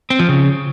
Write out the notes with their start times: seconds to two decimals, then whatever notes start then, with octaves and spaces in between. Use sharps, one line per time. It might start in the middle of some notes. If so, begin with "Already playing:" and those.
0.10 C4
0.20 F3
0.29 C#3